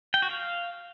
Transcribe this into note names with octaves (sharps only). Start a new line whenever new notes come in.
G5
F#4
F5